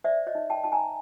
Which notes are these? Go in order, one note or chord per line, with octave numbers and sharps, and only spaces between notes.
C5 D5 E5
C#5 D#5
D#4
G5 A5
D#4 A5
G#5 A#5